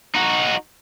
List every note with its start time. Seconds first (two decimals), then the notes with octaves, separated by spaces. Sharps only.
0.15 D#4 F#4